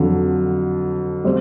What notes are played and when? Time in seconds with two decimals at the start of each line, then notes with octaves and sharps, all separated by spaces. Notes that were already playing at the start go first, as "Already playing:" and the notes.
Already playing: F2 D3 F#3
1.24 G3 C4